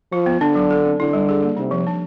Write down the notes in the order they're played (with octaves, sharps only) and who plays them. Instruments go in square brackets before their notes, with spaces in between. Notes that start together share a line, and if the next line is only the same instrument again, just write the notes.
[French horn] F3 [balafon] F4
[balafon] B3
[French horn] D3 [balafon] D4
[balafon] F#3
A4
C4
[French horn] D3 [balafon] E4
[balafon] G3
G#4
A#3
[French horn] C3 [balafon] D#4
[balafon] F3
D4